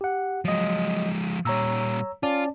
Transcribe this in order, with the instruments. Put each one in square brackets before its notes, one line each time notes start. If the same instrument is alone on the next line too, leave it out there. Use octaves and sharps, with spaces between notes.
[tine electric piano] G4 F#5
[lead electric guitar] F3 G#3 [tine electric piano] F#3 D#5
[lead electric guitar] A#2 G3 [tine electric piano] C#5 A#5 E6
[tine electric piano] C#4 D5 A5 [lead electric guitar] F4